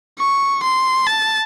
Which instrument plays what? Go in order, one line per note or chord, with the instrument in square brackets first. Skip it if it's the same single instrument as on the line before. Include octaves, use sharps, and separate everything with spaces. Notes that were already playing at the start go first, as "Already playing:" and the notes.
[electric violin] C#6
C6
A5